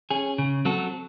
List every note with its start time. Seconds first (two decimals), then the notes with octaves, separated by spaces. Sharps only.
0.11 C#4 G#4
0.38 C#3
0.65 F#3 C4 F#4 A4